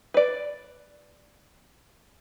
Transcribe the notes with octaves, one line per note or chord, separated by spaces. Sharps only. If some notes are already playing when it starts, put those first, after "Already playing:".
B4 D5